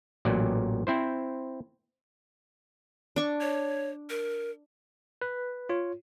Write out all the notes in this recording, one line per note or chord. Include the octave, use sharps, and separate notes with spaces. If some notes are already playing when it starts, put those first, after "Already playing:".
A1 A#2 F#3 D5
C4 E4 C5
D4 C#6
C#5
A#4
B4
F4 C#5